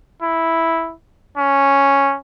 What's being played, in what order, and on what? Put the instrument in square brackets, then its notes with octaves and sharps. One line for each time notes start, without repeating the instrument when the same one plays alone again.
[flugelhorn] E4
C#4